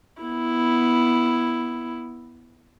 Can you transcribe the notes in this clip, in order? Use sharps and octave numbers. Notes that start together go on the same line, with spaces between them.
B3 E4